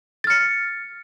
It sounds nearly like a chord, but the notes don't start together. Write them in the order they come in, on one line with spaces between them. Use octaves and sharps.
A6 F6 C#7